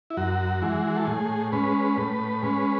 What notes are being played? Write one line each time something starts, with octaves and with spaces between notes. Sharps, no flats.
E4
F#2 F#4
E3 G#3
A4
A2 G#4
G#3 C#4 B4
A2
G#3 C#4